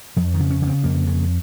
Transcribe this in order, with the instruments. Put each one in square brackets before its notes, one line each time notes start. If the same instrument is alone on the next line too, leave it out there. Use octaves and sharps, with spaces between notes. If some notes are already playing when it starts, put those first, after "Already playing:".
[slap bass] F2 F3
D#3
C#3
C#4
C#3
C4
F2 A#3
C#3